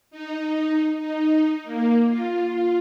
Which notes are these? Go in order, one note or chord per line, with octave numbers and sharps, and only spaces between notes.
D#4
D#4
A#3
F4